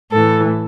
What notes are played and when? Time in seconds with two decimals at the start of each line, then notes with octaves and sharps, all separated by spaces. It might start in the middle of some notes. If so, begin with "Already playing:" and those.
0.11 A2 E3 A4